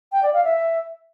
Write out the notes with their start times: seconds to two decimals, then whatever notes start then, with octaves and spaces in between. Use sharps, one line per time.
0.12 G5
0.23 D5
0.33 F5
0.44 E5